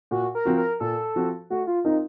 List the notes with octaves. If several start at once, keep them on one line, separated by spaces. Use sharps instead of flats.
A#2 F#4
A#4
F3 C4 F#4
A#4
A#2 A4
F3 C4 F#4
A3 F#4
F4
C4 D#4 F4 A#4